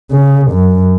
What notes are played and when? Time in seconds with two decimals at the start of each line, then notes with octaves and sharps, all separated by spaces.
0.12 C#3
0.51 F#2